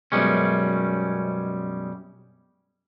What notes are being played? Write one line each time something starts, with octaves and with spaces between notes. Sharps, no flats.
F#2 B2 G3 G#3 C#4